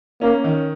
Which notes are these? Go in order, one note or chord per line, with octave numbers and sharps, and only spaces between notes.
A#3 C#4
D#3